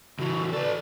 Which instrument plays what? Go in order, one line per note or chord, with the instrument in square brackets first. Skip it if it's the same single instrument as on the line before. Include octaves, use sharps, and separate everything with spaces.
[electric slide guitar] C#3 E3 [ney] F#4
[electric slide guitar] A4 B4 [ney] D5